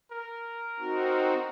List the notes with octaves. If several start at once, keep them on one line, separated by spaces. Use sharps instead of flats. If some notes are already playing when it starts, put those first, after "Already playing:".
A#4
C4 D#4 F#4